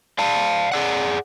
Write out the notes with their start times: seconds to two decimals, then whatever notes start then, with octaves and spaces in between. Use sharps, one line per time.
0.18 D5 F5 A5
0.72 G#4 D5 F#5